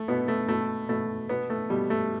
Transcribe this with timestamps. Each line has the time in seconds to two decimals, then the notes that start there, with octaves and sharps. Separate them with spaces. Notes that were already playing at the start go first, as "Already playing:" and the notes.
Already playing: A3
0.08 B2 B3
0.28 A3
0.48 B2 A3
0.89 B2 A3
1.29 B2 B3
1.50 A3
1.70 B2 G3
1.90 A3